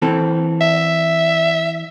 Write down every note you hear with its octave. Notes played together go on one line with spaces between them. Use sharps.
E3 C4 A4
E5